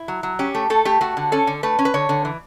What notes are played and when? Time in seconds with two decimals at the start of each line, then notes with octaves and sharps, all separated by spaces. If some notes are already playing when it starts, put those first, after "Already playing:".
Already playing: E4
0.08 F#3
0.23 F#3
0.39 C#4 G4
0.55 A3
0.70 A3 A4
0.85 A3 G4
1.01 A3 F#4
1.17 D3
1.32 C#4 A4
1.47 D3
1.63 A3 B4
1.79 C#4
1.85 B4
1.94 D3 C#5
2.09 D3
2.25 E3